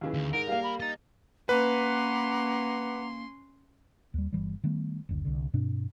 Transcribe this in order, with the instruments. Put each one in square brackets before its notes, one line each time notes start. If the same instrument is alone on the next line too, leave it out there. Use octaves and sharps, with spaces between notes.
[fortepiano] D#2 C#3 E3
[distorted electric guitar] D2
[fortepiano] G#2 [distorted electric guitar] A#4 [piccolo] D7
[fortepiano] G3 A#3 [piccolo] F5
[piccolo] B5
[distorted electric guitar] D#5 A#5 [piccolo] A6
[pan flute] A#3 [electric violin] C#4 C6 [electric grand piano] B4 [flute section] F#5 A#5 D6
[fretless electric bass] D#2 G3
G1 E3 G3
D#3 G3 A3 B3
F#1 D2
C2 D3
G2 B2 C4 D4